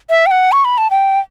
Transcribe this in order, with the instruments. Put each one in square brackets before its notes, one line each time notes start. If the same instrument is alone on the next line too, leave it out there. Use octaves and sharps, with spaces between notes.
[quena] E5
G5
F#5
C#6
B5
A5
G5